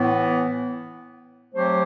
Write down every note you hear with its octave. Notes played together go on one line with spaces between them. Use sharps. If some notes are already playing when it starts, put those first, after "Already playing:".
Already playing: A2 E3 B3
F#3 A3 C4 G4 C5